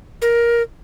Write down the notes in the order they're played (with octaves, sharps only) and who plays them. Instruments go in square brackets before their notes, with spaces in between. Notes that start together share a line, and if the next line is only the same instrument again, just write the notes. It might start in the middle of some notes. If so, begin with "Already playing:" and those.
[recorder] A#4